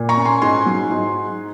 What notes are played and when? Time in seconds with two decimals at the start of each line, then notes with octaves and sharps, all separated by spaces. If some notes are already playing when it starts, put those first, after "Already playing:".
Already playing: A#2
0.09 A#5 C#6
0.17 C#4
0.25 G#5 C6
0.42 G#2 G#5 C6
0.66 F#3
0.91 G#2